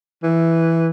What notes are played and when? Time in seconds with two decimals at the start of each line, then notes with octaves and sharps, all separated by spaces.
0.23 E3